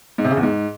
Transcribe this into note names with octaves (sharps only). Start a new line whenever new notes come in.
G#2
C3
C#3
E2
G#2